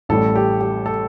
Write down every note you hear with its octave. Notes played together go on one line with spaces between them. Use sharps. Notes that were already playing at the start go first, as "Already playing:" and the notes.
A1 A2 G3 A4
G4
G4
A4